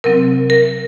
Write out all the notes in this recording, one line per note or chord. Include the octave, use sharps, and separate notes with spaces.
C3 F#3 C4 A#4
A#4